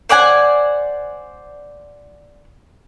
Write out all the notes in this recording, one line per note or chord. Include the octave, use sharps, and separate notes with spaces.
C5 D5 F#5 G#5